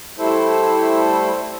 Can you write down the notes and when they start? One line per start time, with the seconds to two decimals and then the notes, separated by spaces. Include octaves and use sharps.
0.19 G3 A3 E4 A4 C5